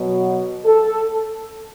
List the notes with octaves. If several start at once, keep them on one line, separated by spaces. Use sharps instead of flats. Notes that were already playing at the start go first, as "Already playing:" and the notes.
Already playing: B2 F#3
A4